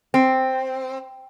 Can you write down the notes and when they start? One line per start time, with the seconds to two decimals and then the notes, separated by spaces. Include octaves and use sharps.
0.14 C4